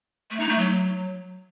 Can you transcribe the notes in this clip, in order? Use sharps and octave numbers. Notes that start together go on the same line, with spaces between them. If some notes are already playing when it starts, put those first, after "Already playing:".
A3
D#4
A3
F#3